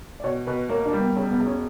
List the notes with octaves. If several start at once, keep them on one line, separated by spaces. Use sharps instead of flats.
D5
B2 C#5
B2 B4
A#3 C#5
D4
G3
B3
E1 C#4
B3
E1
C#4